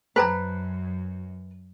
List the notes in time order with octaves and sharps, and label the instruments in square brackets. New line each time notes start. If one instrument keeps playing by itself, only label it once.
[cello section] F#2 [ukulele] B4 [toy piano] C5 A5 A#5